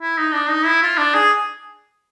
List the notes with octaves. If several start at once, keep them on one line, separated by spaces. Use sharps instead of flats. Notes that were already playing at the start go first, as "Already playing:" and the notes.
E4
D#4
D4
D#4
E4
F4
D4
G#4